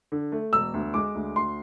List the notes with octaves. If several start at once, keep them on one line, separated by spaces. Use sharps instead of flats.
D3
A3
E1 E6
D2
G#3 D6
D2
D2 C6